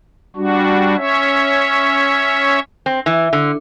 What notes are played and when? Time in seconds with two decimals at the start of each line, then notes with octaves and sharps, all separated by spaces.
0.36 G3 D4 F#4
0.97 C#4 C#5 E5
2.86 C4
3.06 E3
3.33 D3